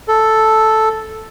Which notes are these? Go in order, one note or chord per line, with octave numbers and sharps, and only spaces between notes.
A4